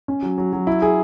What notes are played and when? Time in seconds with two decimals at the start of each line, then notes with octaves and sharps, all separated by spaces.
0.08 C#4
0.23 F#3
0.38 F#3
0.53 F#3
0.67 E4
0.82 G#4